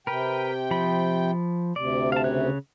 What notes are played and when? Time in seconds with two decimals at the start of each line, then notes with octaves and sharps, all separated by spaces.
0.07 C3 A#4 B4 G5
0.71 F3 B5
1.76 D2 C3 D5
2.12 F5 A5
2.24 C#3 C#5 F#6